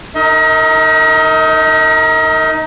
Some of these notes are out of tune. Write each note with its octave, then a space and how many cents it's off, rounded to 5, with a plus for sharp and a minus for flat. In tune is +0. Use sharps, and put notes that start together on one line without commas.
D#4 +0 A#4 -30 D#5 +35